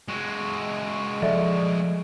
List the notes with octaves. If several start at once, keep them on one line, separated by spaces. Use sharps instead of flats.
G#3 F#4
F3 A4 D5 E5